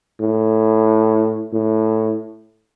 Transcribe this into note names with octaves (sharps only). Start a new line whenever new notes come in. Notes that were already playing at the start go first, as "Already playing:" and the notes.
A2
A2